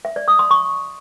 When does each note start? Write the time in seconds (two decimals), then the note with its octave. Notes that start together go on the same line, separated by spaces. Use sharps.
0.05 E5
0.16 D5
0.28 D#6
0.39 C6
0.51 C#6